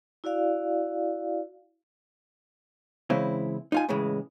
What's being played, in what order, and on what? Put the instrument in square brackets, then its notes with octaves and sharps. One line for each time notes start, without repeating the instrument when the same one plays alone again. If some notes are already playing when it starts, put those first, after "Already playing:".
[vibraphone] E4 F#4 D5 F5
[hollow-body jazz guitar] C#3 E3 G#3 C4 E4
D#4 F4 G#5
A2 C#3 E3 G#3